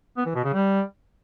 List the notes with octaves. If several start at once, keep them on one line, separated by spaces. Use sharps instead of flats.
B3
E3
B2
C#3
G3